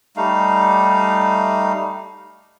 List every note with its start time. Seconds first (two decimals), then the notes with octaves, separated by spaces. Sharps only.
0.17 G3 A3 D#4 F5